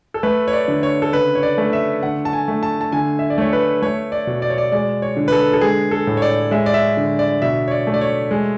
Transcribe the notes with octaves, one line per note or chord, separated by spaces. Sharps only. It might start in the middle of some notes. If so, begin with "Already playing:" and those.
A4
A3 B4
C#5
D5
D3
C#5
A4
C#3 B4
C#5
D5
A3
E5
D3 F#5
A5
G#5
A3
A5
A5
D3 G#5
E5
D5
A3 C#5
B4
A3 C#5
D5
B2
D5
C#5
D5
G#3 D5
C#5
D3
B4
A4
A4
G#3 G#4
A4
A2
C#5
D5
G#3 E5
D5
E5
D3
D5
B2 E5
C#5
D5
A3
D5
C#5
G#3